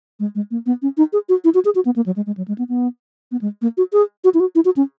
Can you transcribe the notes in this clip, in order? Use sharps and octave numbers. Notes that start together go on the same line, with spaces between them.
G#3
G#3
A#3
B3
C#4
D#4
G#4
F#4
E4
F#4
G#4
F#4
B3
A#3
F#3
G#3
G#3
F#3
G#3
B3
B3
B3
G#3
A#3
F#4
G#4
F#4
E4
F#4
E4
F#4
C#4